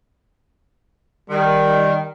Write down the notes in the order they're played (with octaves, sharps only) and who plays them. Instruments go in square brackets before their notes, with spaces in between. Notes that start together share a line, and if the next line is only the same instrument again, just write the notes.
[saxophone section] D#3 [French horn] G3